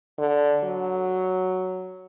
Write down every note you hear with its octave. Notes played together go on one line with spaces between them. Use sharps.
D3
F#3